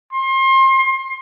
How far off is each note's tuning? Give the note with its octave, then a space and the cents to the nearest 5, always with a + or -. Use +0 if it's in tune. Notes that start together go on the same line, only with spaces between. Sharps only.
C6 +30